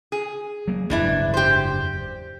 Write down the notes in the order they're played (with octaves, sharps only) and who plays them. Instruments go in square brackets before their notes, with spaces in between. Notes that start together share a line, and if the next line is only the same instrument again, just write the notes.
[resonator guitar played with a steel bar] G#4
[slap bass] F#3 A#3
[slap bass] F#1 E2 G#2 [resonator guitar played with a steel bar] E3 D4 E4
[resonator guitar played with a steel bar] G4 C5